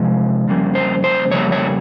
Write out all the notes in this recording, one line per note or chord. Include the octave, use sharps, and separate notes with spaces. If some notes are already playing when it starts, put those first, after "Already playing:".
Already playing: C3 F3 G#3
F2 C#3 G3 A#3
C5
C5
F2 C#3 G3 A#3 C#5
C#5